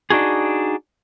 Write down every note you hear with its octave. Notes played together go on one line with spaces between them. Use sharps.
D4 D#4 F#4 G#4